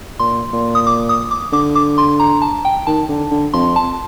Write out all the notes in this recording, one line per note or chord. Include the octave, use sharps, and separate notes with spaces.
A#2 C6
A#2
D#6
D6
D#6
D6
D3 D6
D6
C6
A#5
A5
G5
D#3 A5
D3
D3
F2 C6
A5